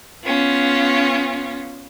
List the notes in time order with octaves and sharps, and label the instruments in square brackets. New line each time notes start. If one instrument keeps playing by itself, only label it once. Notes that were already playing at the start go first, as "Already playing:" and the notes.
[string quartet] B3 C#4 F4